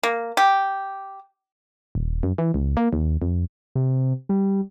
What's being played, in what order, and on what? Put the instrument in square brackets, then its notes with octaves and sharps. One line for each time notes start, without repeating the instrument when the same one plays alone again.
[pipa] A#3
G4
[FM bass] D#1
F#2
E3
C#2
A#3
D#2
F2
[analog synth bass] C3
G3